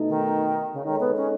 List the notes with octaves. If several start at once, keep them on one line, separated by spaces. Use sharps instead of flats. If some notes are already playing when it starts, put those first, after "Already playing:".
Already playing: B2 A3 D#4
D#3
C#3
D#3 G#3 D#4 A4 C#5
B3
C#4